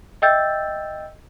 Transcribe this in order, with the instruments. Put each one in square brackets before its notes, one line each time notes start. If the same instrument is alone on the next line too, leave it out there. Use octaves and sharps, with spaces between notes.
[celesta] D#5 E5 G5 E6 G6 A6